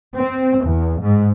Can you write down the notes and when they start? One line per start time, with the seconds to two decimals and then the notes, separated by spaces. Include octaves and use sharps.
0.16 C4
0.64 E2
1.01 G#2